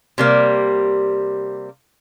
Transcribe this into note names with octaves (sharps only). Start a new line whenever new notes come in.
C3 G3 A#3